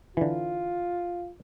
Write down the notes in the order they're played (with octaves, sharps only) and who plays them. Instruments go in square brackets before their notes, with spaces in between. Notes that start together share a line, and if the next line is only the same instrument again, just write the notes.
[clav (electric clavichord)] D3 E3 [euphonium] F4